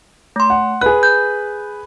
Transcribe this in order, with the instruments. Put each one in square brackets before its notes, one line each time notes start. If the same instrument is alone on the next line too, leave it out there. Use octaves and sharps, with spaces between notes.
[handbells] A3 C6
[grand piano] F#5
[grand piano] G#4 B4 [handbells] F#6
[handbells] G6